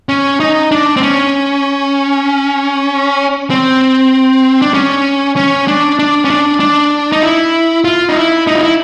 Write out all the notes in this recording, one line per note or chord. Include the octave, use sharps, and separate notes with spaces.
C#4
D#4
D4
C4
C#4
C4
D4
C#4
C#4
D4
D4
C#4
D4
D4
D#4
E4
F4
D#4
E4
D#4
F4
E4